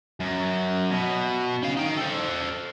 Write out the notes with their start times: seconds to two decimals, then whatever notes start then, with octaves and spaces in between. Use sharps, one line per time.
0.20 F#2
0.91 B2
1.63 C#4 F5
1.77 D#4 G5
1.97 A4 C5